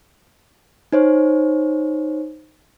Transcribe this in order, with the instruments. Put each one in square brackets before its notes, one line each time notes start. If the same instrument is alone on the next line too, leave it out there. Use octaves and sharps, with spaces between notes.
[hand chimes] D#4 C5 C#5